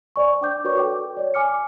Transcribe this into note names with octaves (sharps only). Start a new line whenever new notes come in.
C5 D5 G#5 C#6
D4 G5 D6 G6
F#4 A#4 B4 C#5 D5 C#6
A4 G5 D6
C#5 D5
G#5 D6 F6 C#7